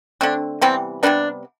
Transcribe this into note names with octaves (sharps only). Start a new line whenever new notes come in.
D3 A3 C4 D4
C3 E3 G3 B3 C4
C3 E3 G3 B3 D4